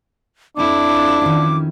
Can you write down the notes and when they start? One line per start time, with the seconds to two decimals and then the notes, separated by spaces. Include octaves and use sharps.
0.57 F2 F3 D4 E4 D6
1.21 D#3 C#4